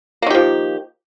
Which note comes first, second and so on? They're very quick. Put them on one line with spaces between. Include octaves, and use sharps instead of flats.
A#3 D#3 G4 F3